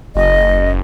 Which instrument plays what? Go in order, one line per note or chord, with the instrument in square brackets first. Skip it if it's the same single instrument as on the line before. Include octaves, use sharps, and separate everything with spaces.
[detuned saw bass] F#1 [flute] D#5